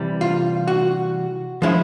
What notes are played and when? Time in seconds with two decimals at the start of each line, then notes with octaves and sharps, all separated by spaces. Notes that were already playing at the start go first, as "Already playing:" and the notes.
Already playing: C3 E3 G3
0.21 F4
0.67 F#4
1.62 F3 G#3 C#4 E4